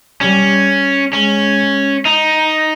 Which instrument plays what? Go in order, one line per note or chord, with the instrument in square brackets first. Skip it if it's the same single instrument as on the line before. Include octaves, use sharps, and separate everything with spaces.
[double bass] G3 [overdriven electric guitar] C#4
[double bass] G#3 [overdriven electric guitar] C#4
[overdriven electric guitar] D#4